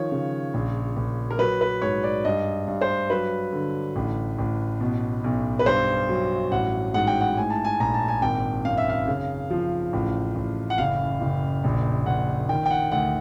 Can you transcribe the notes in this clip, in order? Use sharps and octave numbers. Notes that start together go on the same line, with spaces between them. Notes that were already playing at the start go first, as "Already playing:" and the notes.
Already playing: D#3 F3 C#5
C#3
A#1
A#1
A#4
F#3 B4
B4
G#2 C#5
D5
G2 D#5
G2
C5
F#3 B4
D3
A1
A1
B2
B1
B4
G2 C5
F#3
A1 F#5
G#2 F#5
G5
F#5
A2 G#5
A5
G#5
A#1 A#5
A5
G#5
G#1 G5
F#2 F5
E5
F5
C#3
F3
A1
A1
F#5
F#1 F5
F#1
A#1
A#1 F#5
D#3 G5
G5
F#5
D2 F#5